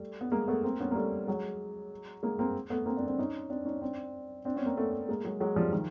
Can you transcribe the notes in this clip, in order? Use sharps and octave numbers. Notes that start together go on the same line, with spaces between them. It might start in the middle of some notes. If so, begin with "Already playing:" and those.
Already playing: G3 A3
B3
G#3 A#3
A3 B3
A#3 C4
B3 C#4
A#3
G3 A3
F#3 G#3
G#3 A#3
A#3 C4
A3 B3
A#3 C4
C4 D4
C4 D4
C#4 D#4
C4 D4
C#4 D#4
C4 D4
C4 D4
B3 C#4
A#3 C4
A3 B3
G#3 A#3
F#3 G#3
F#3 G#3
F3 G3
D#3 F3